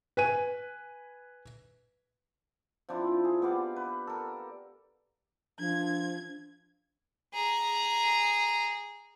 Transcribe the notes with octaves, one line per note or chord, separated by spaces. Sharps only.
B4 G#5 D#7
F3 C4 D4 E4
G#4
B3 G4 D5 F5
B4
A4 A#4
F3 D4 G#6
G#4 A#5